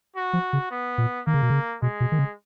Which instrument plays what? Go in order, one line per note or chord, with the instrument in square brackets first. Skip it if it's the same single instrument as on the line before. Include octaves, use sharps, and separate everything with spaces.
[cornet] F#4
[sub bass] F3
C#3
[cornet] B3
[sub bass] A#2
[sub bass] D#3 [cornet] A#3
[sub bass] C#3
B2
C#3
[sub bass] B2 [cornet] G#3
[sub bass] B2
D#3
C#3